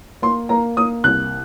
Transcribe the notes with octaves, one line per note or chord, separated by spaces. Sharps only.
A#3 C6
A#3 A#5
A#3 D#6
C2 F#6